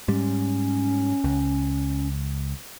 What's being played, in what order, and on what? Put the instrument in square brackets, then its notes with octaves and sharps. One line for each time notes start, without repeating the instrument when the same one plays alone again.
[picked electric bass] G#2 G3 [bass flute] C#4
[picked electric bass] C#2